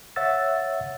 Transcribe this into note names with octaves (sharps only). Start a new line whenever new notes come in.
C#5 E5 F#5 E6 A6